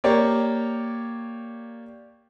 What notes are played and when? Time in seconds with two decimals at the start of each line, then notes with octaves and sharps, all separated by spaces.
0.04 A#3 G4 C#5 D5